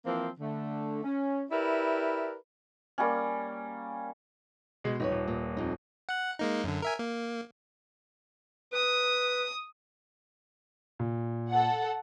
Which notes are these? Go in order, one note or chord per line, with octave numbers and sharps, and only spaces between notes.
E3 F3 A#3 C4
D3 A3
C#4
E4 G4 A#4 B4 D5 E5
G3 A#3 C#4
B2 G#3
D#1 D#4 B4 C#5
D#1
A#2
F2 D#4
F#5 F#6
G#3 A#3 D#4
F#2 D3
A#4 E5 G#5
A#3
B4 D#6
A#2
A4 F#5